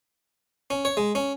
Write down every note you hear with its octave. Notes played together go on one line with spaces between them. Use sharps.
C#4
C#5
G#3
C#4